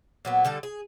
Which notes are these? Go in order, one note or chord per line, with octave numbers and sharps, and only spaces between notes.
A#2 F#3 B3
D3 G3 A4
G#4